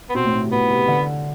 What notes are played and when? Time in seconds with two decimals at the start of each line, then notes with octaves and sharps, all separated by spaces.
0.09 B3
0.15 B2 C4
0.25 A2
0.34 B2
0.43 C3
0.52 B2 B3
0.70 C3
0.88 D3